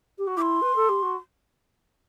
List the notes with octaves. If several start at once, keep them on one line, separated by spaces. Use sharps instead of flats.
G4
F#4
E4 C6 D6
B4
A4
G4
F#4